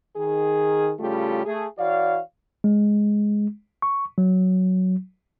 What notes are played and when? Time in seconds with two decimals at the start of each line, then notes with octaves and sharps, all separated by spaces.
0.17 D#3 G#4
1.00 A2 C#3 G3 A3 F4 G4
1.45 A3 G#4
1.79 E3 F#4 C#5 D5 F5
2.64 G#3
3.82 C#6
4.18 F#3